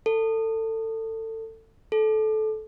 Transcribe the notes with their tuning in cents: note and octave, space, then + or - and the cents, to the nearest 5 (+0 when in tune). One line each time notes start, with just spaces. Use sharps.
A4 +25
A4 -20